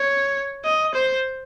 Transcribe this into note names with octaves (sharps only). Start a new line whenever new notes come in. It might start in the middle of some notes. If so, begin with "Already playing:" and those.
Already playing: C#5
D#5
C5